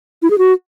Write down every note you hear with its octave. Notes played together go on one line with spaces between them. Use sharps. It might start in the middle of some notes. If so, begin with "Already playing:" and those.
E4
G#4
F#4